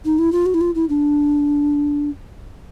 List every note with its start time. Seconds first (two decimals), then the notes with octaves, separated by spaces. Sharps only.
0.05 D#4
0.19 E4
0.32 F4
0.46 F#4
0.54 E4
0.61 F4
0.75 E4
0.89 D4